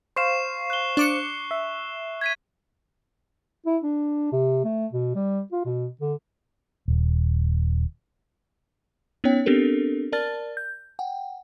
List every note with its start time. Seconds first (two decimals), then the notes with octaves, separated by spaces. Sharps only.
0.16 C5 F5 C#6 C7 E7
0.70 F#6 G7
0.97 D4 D6 C#7
1.51 E5
2.21 G#6 B6 D#7
3.66 E4
3.83 D4
4.32 C3
4.64 A3
4.93 B2
5.15 G3
5.52 F4
5.65 B2
6.01 D3
6.88 D#1
9.24 B3 C#4 D#4 C#5 G5
9.46 B3 C4 D4 G4 A4 A#4
10.12 A#4 D5 A5 F6 A6
10.57 G6
10.99 F#5 G5